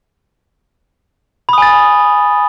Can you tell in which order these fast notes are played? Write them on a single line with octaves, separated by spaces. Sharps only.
B5 D#6 G#5 A6